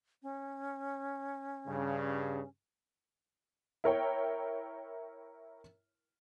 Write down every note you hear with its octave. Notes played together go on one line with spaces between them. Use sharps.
C#4
G2 C#3
E4 A#4 C#5 G5